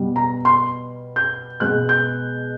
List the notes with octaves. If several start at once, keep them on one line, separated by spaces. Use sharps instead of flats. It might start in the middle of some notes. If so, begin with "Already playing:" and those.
Already playing: B2 G3 B3
A#5
C6
G6
B2 G#3 B3 F#6
G6